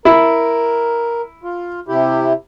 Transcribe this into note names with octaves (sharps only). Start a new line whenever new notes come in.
E4 A#4
F4
C3 E4 G4